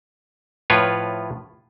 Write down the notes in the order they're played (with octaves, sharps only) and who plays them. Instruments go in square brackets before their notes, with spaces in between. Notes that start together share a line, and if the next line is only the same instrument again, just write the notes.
[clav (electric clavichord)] A2 F3 F4 B4 C#5 G5